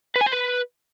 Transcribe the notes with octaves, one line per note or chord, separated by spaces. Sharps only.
B4
G#5
C5
B4